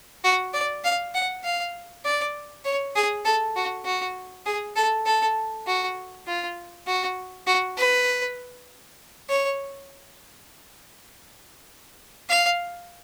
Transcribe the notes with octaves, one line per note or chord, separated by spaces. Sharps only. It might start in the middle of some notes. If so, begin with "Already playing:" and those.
F#4
D5
F5
F#5
F5
D5
C#5
G#4
A4
F#4
F#4
G#4
A4
A4
F#4
F4
F#4
F#4
B4
C#5
F5